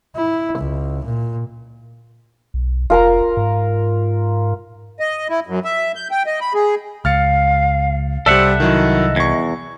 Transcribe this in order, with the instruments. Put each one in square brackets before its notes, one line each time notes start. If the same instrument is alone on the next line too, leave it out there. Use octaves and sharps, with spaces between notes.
[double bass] E4
C#2
A#2
[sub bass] B1
[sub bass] F1 [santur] F4 A#4 A#5
[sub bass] G#2
[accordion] D#5
E4
F#2
E5
G6
G5
D#5
B5
G#4
[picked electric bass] C#2 [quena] F5 [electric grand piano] F6 A6 C#7
[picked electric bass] C2 [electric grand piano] G3 D5 [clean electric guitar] A4 E5 F#5 [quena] C5
[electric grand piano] D#3 F#3 E4 [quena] D#5
[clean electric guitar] E2 [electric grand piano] C#6 G#6